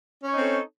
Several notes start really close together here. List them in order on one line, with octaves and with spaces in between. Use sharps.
C#4 C#5 D#4 C4 A4